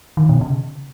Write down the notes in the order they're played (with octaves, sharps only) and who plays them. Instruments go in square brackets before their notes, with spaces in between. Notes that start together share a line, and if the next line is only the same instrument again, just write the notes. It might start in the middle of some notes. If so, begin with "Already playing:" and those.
[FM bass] D#3
B2
C#3